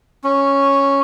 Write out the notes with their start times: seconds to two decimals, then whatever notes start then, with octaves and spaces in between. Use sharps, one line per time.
0.24 C#4